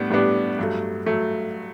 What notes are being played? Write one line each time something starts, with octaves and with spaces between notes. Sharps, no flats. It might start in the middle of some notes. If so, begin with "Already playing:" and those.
Already playing: A2 G3 B3 D4
A2 G3 B3 D4
G2 F#3 A3
F#3 A3